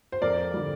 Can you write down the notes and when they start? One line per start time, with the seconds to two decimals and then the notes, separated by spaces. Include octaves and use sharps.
0.12 C5
0.22 F2 A#4 D5
0.53 D3 G3